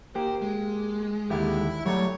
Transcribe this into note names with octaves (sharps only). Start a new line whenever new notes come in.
A#3 G4 C5
G#3
D#2 D3 E4 G4
F#3 G3 A3 C#5